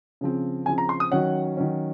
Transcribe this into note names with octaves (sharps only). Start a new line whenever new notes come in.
C#3 F3 C4
C#3 F3 C4 G#5
A#5
C6
D#6
D#3 F#3 C#4 F#5
D#3 F#3 C#4